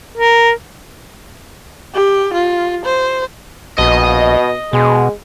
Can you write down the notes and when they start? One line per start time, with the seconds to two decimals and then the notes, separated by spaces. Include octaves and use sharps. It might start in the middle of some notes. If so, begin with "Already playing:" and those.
0.18 A#4
1.94 G4
2.33 F4
2.85 C5
3.78 A#1 B2 D#5
4.73 B2 G#3